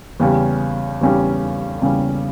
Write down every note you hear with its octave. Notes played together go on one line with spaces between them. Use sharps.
E2 C#3 G3 C#4 G4
E2 C#3 G3 C#4 G4
E2 C#3 G3 C#4 G4